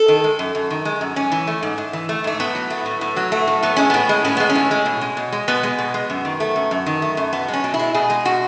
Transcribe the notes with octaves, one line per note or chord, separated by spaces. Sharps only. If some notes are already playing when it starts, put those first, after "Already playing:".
Already playing: A4
D#3
G#3
F#2
F#2
D#3
G#3
F#2
G#2 C#4
E3
A3
G#2
G#2
E3
A3
G#2 A3
A2 B3
F#3
A3
A2
A2
F#3
A3
A2
A2 B3
G#3 C#4
A2 B3
G#3
A2 C#4
G#3 B3
C#4
A2
G#3
B2
G#3
B2
G#3
B2 B3
G#3
B2
G#3
F#2
D#3
A3
F#2
F#2
D#3
A3
F#2
B2 B3
G#3
C#4
B2
E4
G#3
B2 G#4
G#3
B2 F#4